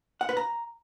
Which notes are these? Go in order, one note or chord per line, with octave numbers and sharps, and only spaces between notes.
F#5
B4
A#5